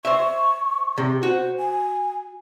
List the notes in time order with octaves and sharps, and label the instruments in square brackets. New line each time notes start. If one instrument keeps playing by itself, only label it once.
[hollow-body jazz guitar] C5 E5 [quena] C#6
[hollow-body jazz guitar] C3
[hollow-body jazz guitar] F#4 [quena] C5
[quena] G#5